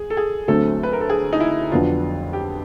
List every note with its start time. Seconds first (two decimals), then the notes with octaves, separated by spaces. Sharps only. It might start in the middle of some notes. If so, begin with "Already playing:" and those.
Already playing: G#4
0.10 A4
0.17 G#4
0.48 D2 D3 F#3 A3 C4 A4
0.83 B4
0.93 A#4
1.01 A4
1.09 G#4
1.33 D#4
1.40 E4
1.71 F2 D3 F#3 B3 D4 F4
2.33 G4